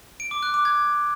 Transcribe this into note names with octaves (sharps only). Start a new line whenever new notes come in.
D7
D6
F#6
D6
G#6